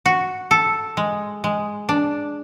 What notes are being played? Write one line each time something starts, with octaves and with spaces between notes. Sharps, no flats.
F#4
A4
G#3
G#3
D4